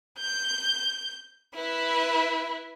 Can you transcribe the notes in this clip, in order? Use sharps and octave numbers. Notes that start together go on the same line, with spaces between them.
G6
E4 B4